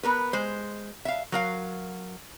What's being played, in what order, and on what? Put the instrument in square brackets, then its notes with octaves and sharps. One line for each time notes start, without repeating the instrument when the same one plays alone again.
[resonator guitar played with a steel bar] B3 A#4 B4
G#3 C5
E5 F5
F#3 A#4 F5